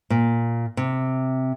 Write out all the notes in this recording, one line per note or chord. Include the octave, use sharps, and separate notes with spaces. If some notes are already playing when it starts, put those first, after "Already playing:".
A#2
C3